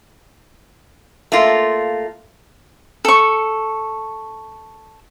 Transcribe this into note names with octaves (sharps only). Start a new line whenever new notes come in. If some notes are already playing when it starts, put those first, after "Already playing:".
A3 A#3 F4
A4 C#6